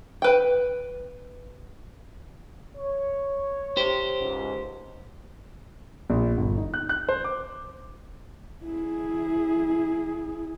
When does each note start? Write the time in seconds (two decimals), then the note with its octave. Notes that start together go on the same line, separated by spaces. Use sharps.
0.22 B4 G5
2.77 C#5
3.77 G4 C5
4.20 C#2 G#2
6.10 A#1
6.37 G1
6.57 D#4
6.74 F#6
6.89 F#6
7.09 C5
7.24 D6
8.64 E4 G#4